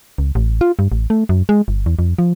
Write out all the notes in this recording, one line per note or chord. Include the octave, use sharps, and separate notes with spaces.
C#2
A1
F4
G2
A1
A3
F#2
G#3
G1
E2
F2
F3